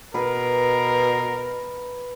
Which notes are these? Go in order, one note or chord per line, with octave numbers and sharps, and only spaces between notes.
B2 A#4 B4